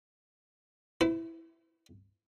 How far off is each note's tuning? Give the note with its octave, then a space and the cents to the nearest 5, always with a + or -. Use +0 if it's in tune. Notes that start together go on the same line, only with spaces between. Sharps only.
E4 +0 B4 +45